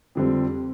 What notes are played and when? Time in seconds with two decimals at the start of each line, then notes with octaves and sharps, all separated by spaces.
0.15 F2 D3 G3 C4